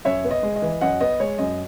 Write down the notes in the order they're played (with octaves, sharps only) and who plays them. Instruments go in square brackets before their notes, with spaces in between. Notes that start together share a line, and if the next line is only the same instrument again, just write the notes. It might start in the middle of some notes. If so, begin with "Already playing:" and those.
[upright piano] F#2 C#5 E5
B3
D#5
G#3
D#5
E3
F#2 D#5 F#5
B3 D#5
G#3 C#5
F#2 D#5